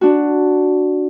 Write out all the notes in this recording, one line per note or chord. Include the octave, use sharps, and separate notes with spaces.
D4 F#4